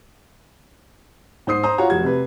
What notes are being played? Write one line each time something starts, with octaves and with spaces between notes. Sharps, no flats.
G#2 C5 D#6 C7
C5 A#5 D#6
F4 F#4 C#5 F#5 A#5
F1 F#4 G#6
C3 B4